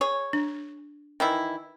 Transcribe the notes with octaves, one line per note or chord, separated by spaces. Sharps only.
G#4 C#5
D4
D#3 E3 E4